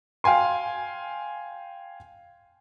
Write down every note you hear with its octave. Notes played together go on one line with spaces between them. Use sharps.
F5 G5 G#5 C6